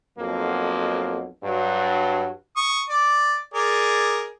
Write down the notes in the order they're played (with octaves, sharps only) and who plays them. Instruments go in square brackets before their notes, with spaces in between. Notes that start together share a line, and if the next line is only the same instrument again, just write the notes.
[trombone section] B1 F2 F#3 A#3
G2 F#3
[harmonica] C#6 D#6
D5
G#4 A#4 D5